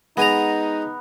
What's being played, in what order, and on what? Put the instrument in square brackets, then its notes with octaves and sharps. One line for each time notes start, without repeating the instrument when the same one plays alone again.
[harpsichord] G#3 G#5 A#5 [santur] B3 [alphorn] D#4